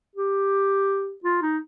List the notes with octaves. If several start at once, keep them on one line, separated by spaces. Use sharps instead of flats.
G4
F4
D#4